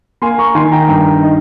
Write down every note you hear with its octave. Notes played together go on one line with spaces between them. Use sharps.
A#3 G#5 C6
A#5 C#6
D#3 G#5 C6
G5 A#5
G2 G5 A#5
D#4